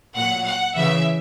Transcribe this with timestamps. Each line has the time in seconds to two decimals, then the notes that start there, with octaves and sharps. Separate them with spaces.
0.16 A#2 F#3 F#5
0.45 F#5
0.75 C#3 E3 E5